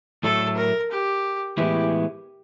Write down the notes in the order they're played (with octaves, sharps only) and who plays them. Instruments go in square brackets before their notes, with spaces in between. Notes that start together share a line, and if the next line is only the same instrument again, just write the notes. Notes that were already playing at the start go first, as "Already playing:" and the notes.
[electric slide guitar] A2 F#3 A3 [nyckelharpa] A4
[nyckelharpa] A#4
G4
[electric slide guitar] A2 E3 G#3 B3 E4 [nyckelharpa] G4